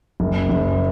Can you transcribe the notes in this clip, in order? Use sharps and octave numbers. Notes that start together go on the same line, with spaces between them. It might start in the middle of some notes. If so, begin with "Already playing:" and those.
F#1
F#1